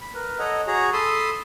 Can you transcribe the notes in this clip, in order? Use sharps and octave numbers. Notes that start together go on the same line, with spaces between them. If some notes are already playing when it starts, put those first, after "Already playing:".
B5
A#4 B4
A4 C#5 D#5 F#5 A#5
F#4 G#4 C#5 A#5
A4 A5 B5 C6 D#6